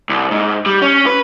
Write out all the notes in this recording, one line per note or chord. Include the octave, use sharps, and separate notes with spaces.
C2
G#2
G3
C#4
B4